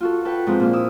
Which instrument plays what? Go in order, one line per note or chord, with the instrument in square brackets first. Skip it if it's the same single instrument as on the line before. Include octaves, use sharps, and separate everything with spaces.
[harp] F4 F#4 A4
A4 B4 F#5 G5
G#2 F3 C4
A#2 D4 F4
E4 D#6 E6